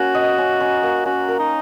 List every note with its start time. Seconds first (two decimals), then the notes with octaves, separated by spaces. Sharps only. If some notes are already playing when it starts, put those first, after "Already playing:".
Already playing: A#3 C#4 F#4
0.15 D#5
0.38 C#4
0.60 C#4
0.83 A#3
1.06 C#4 F#4
1.29 A#4
1.39 D#4